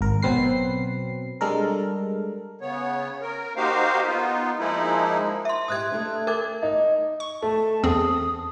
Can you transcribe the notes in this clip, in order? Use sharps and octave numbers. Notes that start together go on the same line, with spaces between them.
G#1 A#4
B2 F#3 C4 B4 C7
G3 G#3 D4 A4 A#4
C#3 B3 C#5
A#4
A#3 D#4 F#4 G4 C5 F5
B3 D#4 F4
F3 G#3 A#3 D#4 E4
E5 C6
G#2 E4 G4 D#6 F#6 G#6
A3 D4
A#4 D6 G#6
D#4
C#6
A3 A5
E2 C4 G#4 D#6